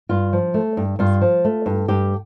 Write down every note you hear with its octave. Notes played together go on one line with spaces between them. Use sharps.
G2 F4
F3
A3
G2
G2 F4
F3
A3
G2
G2 G4